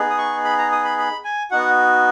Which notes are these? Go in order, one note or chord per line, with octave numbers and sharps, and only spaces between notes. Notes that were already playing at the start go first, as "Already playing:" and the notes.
Already playing: B3 D#4 G#4
D#6
C#6
B5
A#5
D#6
B5
B5
G#5
B3 D#4 F#4 F#5